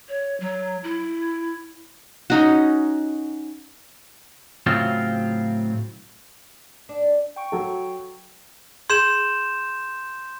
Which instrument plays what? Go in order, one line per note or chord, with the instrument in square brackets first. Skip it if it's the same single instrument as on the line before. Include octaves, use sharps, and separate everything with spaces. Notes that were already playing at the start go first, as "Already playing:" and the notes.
[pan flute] C#5
F#3
E4
[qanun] C#4 D#4 F#4
[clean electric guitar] A2 C#3 F#3 C4 F4
[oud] D4
[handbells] G5 C#6 D7
[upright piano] F#3 A4
[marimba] G#4 [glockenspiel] C6 G6 E7